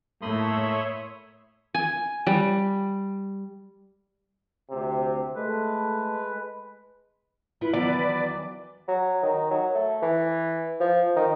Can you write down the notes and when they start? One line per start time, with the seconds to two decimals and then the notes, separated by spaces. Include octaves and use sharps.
0.22 A2 A3 A#3 C#5 E5 B5 C6 D#6
1.75 G#5
2.27 G3
4.70 D2 C3
5.36 G#3 A3 B4
7.61 E4 F4 B4
7.73 E2 D#3 F#3 D5
8.88 F#3
9.23 D#3
9.51 F#3
9.74 A3
10.02 E3
10.80 F3
11.16 D#3